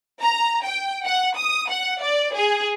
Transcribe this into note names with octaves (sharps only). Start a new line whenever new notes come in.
A#5
G5
F#5
D#6
F#5
D5
G#4